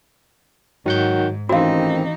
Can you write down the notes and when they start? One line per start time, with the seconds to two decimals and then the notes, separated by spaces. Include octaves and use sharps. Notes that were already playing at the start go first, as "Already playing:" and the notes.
0.86 G#2 D#3 F#3 F#5 G6
1.49 A1 D#3 E3 C4 D#4 F#4 F5